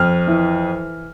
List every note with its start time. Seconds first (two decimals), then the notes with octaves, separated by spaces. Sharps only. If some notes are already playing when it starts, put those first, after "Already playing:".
Already playing: F2 F6
0.27 E3